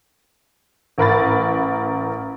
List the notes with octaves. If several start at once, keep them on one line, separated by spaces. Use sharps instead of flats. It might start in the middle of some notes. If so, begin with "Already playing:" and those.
A1 A#4 B5 A6